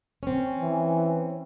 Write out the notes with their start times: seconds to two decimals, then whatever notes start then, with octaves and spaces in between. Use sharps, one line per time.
0.23 C4 C#4
0.60 E3